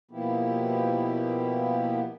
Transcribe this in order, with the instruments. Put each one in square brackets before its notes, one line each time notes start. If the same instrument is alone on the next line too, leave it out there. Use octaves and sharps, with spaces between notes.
[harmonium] B2 F3 A#3 B3 E4 G4